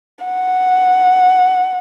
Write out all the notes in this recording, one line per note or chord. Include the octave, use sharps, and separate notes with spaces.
F#5